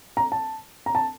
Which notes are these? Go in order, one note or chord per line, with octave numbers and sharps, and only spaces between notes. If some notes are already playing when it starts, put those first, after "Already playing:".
A#5
A5
A#5
A5